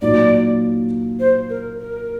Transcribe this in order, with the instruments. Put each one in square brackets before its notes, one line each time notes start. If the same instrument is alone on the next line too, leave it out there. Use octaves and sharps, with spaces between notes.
[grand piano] A#2 F#3 A#3 D#4 [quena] D5
[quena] C5
A#4
A#4